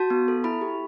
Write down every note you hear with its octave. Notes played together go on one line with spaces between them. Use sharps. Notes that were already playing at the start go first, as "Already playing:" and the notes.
Already playing: F#4 A5
B3
A4
E4 B5
G4